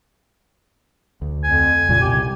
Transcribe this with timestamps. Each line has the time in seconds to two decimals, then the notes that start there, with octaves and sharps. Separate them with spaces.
1.22 D2
1.44 F2 G#5
1.89 G#1 A#2 C#3 G3
2.01 C2 C3 G4